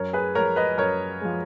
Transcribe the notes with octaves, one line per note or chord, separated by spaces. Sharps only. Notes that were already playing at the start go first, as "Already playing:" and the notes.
Already playing: F#2 A#4 C#5
G#4 B4
F3 G#3 A#4 C#5
B4 D#5
F#2 A#4 C#5
F3 G#3